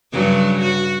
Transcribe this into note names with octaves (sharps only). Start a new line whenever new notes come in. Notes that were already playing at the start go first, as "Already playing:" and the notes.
G2 C#3 F#3
F#4